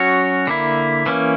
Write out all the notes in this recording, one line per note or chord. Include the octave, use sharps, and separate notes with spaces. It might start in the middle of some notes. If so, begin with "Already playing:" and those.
Already playing: F#3 C#4 F#4 C#5
D3 A#3 E4
E3 A#3 C#4